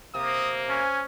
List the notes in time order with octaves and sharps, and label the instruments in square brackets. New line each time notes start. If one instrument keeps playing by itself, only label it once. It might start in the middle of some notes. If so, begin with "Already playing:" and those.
[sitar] C3 [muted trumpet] A#3 [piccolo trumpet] D#6
[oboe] C#4 [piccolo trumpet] G#5